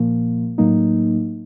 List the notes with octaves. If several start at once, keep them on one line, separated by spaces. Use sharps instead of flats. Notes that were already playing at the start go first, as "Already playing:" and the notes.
Already playing: A#2 F3 A#3
A2 F#3 A#3 D#4